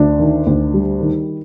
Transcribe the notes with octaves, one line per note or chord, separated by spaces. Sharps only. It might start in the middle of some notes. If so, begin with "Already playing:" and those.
Already playing: D2 D4
D#3
D2
G3
D#3